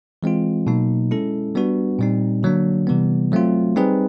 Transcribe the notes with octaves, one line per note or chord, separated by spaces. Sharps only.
E3 G#3 C4 F4
B2 F#3 A#3 D#4
G#3 C#4 E4 A4
G3 B3 D4 F#4 B4
A#2 G3 C4 D#4
D3 F#3 A#3 D4
C3 E3 G3 B3
F#3 A3 C4 F4
G3 C4 D#4 G#4 B4